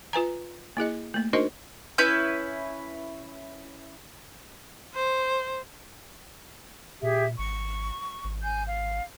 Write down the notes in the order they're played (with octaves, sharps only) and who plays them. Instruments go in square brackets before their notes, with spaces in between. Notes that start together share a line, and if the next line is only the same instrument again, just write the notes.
[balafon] F4 B4 G#5 A#5
A#3 E4 G#4 D#5
A3 A#3
D4 D#4 F#4 A#4 C5 D#5
[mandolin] C#4 E4 B4 G6
[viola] C5
[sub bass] A#2 [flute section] G4 G#4 E5
[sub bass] G#1 [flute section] C#6
[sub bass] G#1
[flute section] G#5 G6
F5